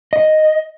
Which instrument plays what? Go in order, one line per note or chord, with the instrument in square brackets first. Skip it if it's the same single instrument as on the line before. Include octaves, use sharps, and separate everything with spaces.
[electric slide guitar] D#5